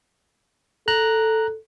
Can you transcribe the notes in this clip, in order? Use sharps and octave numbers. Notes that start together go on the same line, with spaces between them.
A4 A#5 F#6